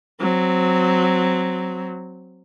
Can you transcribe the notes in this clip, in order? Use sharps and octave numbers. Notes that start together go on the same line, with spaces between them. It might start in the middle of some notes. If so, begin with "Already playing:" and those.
F#3 C4